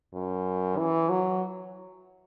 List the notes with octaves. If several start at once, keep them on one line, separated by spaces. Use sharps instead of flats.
F#2
E3
F#3